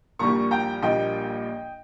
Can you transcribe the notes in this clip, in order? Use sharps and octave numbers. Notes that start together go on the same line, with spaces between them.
A#1 A#2 G3 A#3 A#5 C#6
G5 A#5
A#1 A#2 G3 A#3 D#5 G5